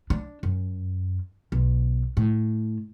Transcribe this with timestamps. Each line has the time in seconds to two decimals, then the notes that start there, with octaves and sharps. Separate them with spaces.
0.10 D4
0.43 F#2
1.52 B1
2.17 A2